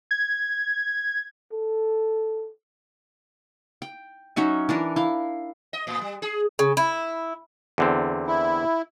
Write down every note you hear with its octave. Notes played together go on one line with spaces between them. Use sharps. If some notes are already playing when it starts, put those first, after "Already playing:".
G#6
A4
G5
F#3 C#4 D#4 E5
E3 D4 A#4
E4 F5
D#5
A2
G3
G#4
C#3
E4
E2 D3 C4
E4